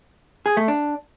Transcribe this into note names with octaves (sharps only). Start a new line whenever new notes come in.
G#4
A3
D4